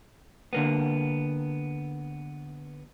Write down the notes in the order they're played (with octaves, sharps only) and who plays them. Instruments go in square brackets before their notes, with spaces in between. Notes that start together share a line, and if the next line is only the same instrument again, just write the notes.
[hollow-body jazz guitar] D3 A#3 B3